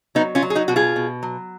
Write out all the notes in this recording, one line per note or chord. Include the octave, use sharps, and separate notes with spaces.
F#3 B3 D#4
C#4 F4
F#3
G#4
D#4 F#4
B2 F#4
F4 G#4
B2
F#3